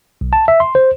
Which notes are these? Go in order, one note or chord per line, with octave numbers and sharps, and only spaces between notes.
B1
A5
E5
C6
C5